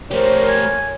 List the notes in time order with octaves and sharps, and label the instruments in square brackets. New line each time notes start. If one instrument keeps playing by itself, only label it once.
[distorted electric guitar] A3 G4 [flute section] A#4 C5 [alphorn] C#5
[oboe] G#5